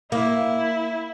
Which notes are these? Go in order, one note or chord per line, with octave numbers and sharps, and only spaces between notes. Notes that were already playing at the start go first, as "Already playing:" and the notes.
A#3 E4